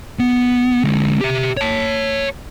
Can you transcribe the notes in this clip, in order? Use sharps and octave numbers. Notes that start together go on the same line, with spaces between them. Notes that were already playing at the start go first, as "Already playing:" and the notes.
B3
D3 G#3
G4 E5
C#5 A5